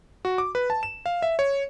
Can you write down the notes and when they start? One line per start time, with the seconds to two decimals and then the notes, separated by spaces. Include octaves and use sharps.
0.25 F#4
0.38 D6
0.55 B4
0.70 A5
0.83 E7
1.06 F5
1.22 E5
1.39 C#5